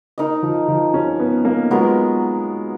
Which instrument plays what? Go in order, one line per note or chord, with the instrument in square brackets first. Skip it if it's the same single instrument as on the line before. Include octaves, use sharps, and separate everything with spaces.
[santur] D#4 A#4 D#5
[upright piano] F3
F3
C#4
B3
A#3
[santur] F#3 B3 F4 A#4 [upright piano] G#3